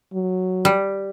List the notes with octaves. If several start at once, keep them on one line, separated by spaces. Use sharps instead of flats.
F#3
G3